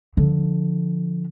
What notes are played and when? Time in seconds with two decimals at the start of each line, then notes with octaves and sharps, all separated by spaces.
0.17 D3 F3